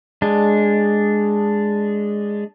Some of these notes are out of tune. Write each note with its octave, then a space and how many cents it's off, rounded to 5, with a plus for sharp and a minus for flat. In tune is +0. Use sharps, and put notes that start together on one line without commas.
G#3 +0 D4 -5